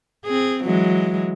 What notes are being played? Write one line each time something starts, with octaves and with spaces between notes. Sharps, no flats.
C4 G#4
E3 F#3 G#3